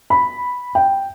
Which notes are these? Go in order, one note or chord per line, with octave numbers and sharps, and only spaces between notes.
B5
G5